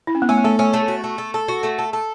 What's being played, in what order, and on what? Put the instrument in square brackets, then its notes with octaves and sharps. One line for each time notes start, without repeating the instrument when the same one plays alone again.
[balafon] E4
C#4
B3
[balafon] A3 [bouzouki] C#4
[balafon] B3
[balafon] A3 [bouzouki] A4
[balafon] A3 [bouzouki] C#4
[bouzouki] A3
F#4
A3
A4
A4
F#4
A3
A4
A4